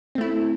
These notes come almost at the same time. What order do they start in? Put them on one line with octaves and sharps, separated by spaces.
C4 A3 E4